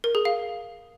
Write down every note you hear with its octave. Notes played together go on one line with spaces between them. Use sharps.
A#4
G#4
F5